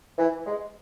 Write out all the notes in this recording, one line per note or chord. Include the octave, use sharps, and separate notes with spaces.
E3
G#3